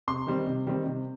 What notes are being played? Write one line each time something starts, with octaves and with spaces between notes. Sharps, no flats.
C3 C6
D#3 G3 C4
C3
D#3 G3 C4
C3